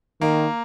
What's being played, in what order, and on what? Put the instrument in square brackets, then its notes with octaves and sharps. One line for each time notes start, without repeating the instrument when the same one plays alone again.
[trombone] D#3 [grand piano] A#3